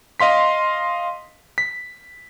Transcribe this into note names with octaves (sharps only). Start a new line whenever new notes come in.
D#5 F5 C6 B6
B6